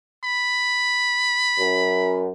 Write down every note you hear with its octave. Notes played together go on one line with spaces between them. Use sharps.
B5
F#2